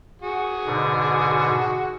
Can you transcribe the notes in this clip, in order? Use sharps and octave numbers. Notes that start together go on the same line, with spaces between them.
F#4 G#4
G#2 B2 D3